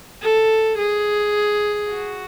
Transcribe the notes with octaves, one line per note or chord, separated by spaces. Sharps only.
A4
G#4
F#4